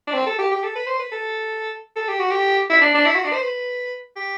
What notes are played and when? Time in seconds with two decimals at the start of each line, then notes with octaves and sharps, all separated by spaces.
0.07 D4
0.14 C4
0.26 A4
0.39 G4
0.51 G4
0.63 A4
0.75 B4
0.87 C5
0.99 B4
1.12 A4
1.96 A4
2.08 G4
2.19 F#4
2.31 G4
2.70 E4
2.81 D4
2.94 D4
3.05 E4
3.15 F#4
3.24 D4
3.33 C5
3.42 B4
4.16 G4